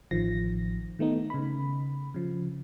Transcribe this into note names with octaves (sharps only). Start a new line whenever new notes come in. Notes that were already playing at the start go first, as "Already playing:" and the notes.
A1 D#3 F3 A#6
D#3 A3 B3 D#4
C#3 B5
C#3 F3